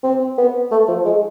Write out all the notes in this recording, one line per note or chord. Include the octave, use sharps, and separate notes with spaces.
C4
B3
A3
F3
G#3